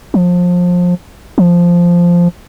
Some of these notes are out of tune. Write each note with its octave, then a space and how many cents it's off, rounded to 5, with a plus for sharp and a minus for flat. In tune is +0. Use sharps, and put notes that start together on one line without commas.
F3 +25
F3 -5